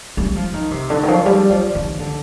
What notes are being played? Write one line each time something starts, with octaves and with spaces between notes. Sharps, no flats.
G3
F3
D#3
C3
D3
D#3
F3
G3
F3
D#3
D3